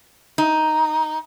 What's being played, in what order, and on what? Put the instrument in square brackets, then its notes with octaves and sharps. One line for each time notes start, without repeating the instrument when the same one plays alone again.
[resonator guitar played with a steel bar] D#4